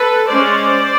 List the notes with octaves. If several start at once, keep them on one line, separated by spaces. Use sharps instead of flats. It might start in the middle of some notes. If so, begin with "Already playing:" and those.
Already playing: A4 B4
G#3 C#4 C5 D5